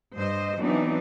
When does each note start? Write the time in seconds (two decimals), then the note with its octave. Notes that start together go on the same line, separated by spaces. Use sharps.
0.16 G2 C5 D#5
0.59 E3 F#3 B3 C4 D4 D#4